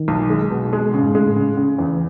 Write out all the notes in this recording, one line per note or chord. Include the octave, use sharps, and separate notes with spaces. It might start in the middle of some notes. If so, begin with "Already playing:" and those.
Already playing: D#3
B1
G#3
B2
G#3
C#3
G#2
A2 G#3
C#3
C#3
E2